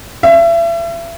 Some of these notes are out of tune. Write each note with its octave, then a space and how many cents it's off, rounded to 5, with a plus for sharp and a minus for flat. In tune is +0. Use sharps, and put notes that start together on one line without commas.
E5 +35